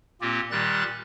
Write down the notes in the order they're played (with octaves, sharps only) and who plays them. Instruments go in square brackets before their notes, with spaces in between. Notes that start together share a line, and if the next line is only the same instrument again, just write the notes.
[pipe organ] A#2 A#3 C4 F4 G4
A#2 D#3 G3 G4 F#6 A6